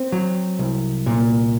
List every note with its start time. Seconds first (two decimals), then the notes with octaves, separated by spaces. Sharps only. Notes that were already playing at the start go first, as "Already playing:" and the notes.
Already playing: C4
0.12 F#3
0.59 C2
1.06 A#2